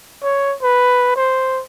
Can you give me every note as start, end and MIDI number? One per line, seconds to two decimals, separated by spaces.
0.23 0.55 73
0.62 1.11 71
1.16 1.62 72